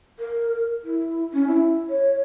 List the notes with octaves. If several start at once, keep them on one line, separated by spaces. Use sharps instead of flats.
A#4
E4
C#4
E4
C#5